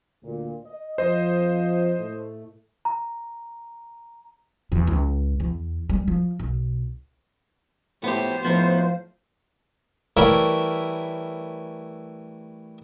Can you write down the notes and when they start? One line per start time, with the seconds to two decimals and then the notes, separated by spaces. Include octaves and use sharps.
0.23 D2 A#2
0.65 D#5
0.98 F2 F3 C5 D#5
1.98 A2 A3
2.85 A#5
4.72 E2 D#3
4.87 C#2
5.40 E2
5.89 G3 G#3
6.08 F3
6.39 B1
8.04 A2 B3 G4 C5
8.44 A2 F3 B3 D#4
10.17 E3 G3 A3 A#4 C#5 E5